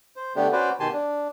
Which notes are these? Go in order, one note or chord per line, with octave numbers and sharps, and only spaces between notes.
C5
D3 A3 B3 D4 G4
C#4 F#4 B4 C5 D5
B2 D#3 G4 G#5 A5 C6
D4